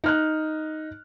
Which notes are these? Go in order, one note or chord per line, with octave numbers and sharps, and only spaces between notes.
D#4 F6 F#6